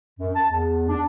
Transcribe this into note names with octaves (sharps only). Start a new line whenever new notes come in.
F#2
A5
E2
D4